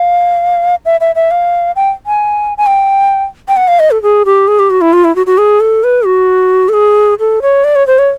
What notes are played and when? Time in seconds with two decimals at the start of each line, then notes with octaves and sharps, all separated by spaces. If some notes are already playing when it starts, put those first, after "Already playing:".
Already playing: F5
0.85 E5
1.01 E5
1.15 E5
1.31 F5
1.76 G5
2.06 G#5
2.58 G#5
2.67 G5
3.48 G5
3.57 F#5
3.68 F5
3.80 D#5
3.91 A4
4.03 G#4
4.25 G4
4.48 G#4
4.59 G4
4.70 F#4
4.81 E4
4.93 F4
5.04 E4
5.16 F#4
5.26 F#4
5.38 G#4
5.60 A4
5.84 B4
6.06 F#4
6.69 A4
6.74 G#4
7.19 A4
7.42 C#5
7.64 D5
7.76 C#5
7.87 C5
7.99 C#5